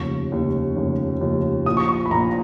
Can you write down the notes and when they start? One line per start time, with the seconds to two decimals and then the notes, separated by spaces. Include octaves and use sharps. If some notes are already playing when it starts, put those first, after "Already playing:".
Already playing: F1 D#2 C#3 F3 C#6
0.31 F1 D#2 C#3 F3
0.76 F1 D#2 C#3 F3
1.21 F1 D#2 C#3 F3
1.66 A#1 A#2 F3 D#6
1.77 C#6
1.89 C#6
2.06 B5
2.11 A#1 A#2 F3 A#5